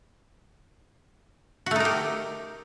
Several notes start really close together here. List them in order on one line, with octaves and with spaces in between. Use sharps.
F#4 A3 D#4 A#4 G4